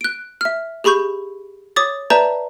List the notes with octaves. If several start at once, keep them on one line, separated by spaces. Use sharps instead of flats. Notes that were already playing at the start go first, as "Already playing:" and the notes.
F#6 D7
E5 F6
G4 G#4 B5 C#6 G6
C#5 D6 D#6 A6
B4 D5 E5 A5 A#5 G6